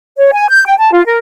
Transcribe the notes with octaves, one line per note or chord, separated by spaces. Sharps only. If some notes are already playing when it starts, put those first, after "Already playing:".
C#5
G#5
G6
G5
A5
F4
A#4